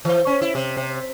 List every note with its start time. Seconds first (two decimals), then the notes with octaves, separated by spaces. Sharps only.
0.05 E3
0.27 C#4
0.42 E4
0.55 C3
0.77 C3